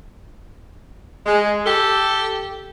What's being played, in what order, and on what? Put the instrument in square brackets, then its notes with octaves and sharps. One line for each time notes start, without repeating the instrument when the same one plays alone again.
[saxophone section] G#3
G4 A4